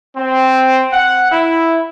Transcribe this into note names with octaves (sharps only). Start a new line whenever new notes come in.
C4
F#5
E4